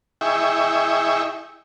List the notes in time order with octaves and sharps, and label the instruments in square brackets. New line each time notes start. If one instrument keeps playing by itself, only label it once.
[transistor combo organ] E4 G#4 D#5 E5 G5 C#6